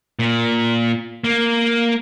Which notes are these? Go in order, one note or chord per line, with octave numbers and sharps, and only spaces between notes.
A#2
A#3